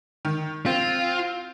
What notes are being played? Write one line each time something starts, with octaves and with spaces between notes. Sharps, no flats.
D#3
C4 F4